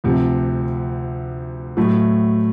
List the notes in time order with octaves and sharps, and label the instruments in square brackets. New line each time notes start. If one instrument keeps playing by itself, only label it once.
[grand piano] D2 C3 F3
A2 F#3 A3